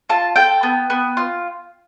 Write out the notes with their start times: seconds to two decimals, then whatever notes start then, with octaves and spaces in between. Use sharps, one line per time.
0.09 F4 A5
0.36 A4 G5
0.63 B3
0.90 B3
1.17 F4